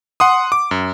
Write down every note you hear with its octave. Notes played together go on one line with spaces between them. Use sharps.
F#5 C6 D#6
D6
F#2